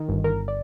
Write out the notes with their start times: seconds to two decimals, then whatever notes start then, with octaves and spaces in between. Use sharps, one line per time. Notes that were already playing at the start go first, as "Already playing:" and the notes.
Already playing: D#3
0.09 G1
0.24 G1 A#4
0.48 D5